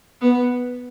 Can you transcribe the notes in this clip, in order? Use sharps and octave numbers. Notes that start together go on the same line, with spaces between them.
B3